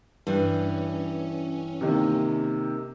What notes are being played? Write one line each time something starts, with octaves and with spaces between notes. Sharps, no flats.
G2 E3 C#4
C3 D#3 A#3